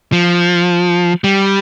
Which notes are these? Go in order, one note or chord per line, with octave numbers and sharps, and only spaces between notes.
F3
G3